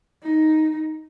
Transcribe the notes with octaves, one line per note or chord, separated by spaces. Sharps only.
D#4